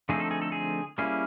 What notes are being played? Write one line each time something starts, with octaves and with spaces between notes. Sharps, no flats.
D3 F3 A3 C4 D#4 G#4
A4
G#4
A4
G#4
G3 A#3 C#4 E4 G#4